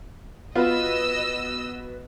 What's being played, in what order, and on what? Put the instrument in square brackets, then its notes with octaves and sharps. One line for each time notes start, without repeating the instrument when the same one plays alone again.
[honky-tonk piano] B3 F#4 B4 [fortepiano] F4 [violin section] D#5 E6